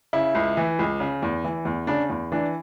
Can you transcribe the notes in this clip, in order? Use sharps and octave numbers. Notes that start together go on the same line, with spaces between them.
C#3 E4
C#2
E3
C#2
C#3
E2
E3
E2
C#3 D4
E2
E3 D4